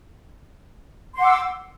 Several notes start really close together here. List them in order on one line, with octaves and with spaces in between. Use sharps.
C6 F#5 D6 E6